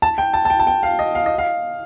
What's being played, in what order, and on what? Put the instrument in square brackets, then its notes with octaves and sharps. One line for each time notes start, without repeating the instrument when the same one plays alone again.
[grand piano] A5
G5
A5
A5
G5
A5
G5
F5
D#5
F5
D#5
F5